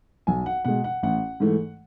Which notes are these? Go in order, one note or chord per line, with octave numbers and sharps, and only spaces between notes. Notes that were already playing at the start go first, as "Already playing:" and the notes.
B1 G#5
F#5
B2 G#3 F#5
F#5
A1 F#5
G#2 E3 A3